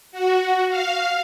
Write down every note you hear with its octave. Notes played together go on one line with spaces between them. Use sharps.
F#4
F5